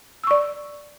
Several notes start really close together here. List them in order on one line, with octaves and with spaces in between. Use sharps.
E6 C#6 D5